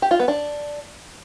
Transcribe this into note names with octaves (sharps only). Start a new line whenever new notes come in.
G4
F4
B3
D4